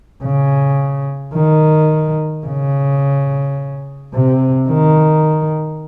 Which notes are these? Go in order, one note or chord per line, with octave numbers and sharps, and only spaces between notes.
C#3
D#3
C#3
C3
D#3